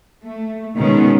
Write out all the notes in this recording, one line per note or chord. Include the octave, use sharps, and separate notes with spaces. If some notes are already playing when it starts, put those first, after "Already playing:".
A3
B2 D#3 G#3 B3 C#4